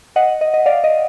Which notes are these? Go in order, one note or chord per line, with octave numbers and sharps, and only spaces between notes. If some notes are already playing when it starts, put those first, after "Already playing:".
D#5 F#5
D#5
D#5
D5 F5
D#5